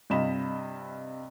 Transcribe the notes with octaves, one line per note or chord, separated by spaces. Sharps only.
G2 C3 F4 D#5 B5 E7